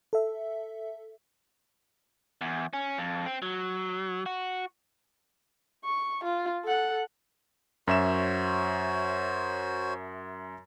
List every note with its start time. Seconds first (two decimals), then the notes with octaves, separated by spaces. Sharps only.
0.13 A4 E5
2.41 E2
2.73 C#4
2.98 F2
3.26 C4
3.42 F#3
4.26 F#4
5.85 C#6
6.24 F4
6.64 A4 F#5
7.88 F#2 F#4 C5 C#5 E5 E7